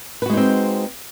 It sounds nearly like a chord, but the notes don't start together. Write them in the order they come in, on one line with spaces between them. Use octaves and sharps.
B4 F#4 G#3 D#4 C4